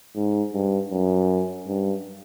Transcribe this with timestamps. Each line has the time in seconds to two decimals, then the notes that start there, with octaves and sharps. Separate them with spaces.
0.16 G#2
0.53 G2
0.91 F#2
1.67 G2